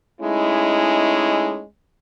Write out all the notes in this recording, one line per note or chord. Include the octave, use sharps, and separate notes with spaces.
G#3 A3 C#4 D#4 E4